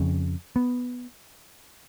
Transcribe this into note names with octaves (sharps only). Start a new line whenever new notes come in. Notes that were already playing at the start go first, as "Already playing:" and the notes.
Already playing: F2 C#3
B3